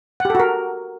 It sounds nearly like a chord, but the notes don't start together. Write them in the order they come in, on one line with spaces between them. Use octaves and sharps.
F#5 G4 A4 F#4 A#4